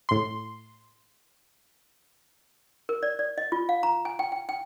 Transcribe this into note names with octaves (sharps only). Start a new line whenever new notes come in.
A2 C6
A#4
D5
D5
D#5
F4
F5
A#5
G#5
G5
G5
G5